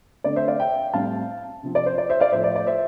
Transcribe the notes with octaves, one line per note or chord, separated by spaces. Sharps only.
D3 A3 C4 D5
C5 E5
D5 F5
E5 G5
A2 G3 C4 F5 A5
C3 F3 C4
D5
C5
D5
C5 E5
D5 F5
A2 F3 A3 C5 E5
D5
D5
C5 E5